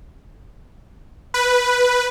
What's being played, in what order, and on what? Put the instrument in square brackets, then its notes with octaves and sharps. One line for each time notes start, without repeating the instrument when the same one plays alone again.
[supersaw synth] B4